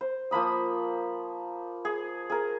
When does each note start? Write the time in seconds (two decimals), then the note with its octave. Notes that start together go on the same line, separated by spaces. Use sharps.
0.01 C5
0.31 F3 A#3 B5 D#6
1.85 G#4
2.30 G#4 A#4